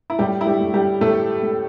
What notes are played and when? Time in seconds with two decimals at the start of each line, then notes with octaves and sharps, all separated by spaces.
0.10 E4
0.19 A2 G3 G4
0.41 E4
0.46 G3 G4
0.60 A3
0.74 G3 G4
1.01 A2 A3 A4
1.43 A3